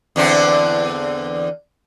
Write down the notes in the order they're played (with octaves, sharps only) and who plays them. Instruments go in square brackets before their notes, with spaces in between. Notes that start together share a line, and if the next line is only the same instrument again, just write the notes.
[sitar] E2 D3 C4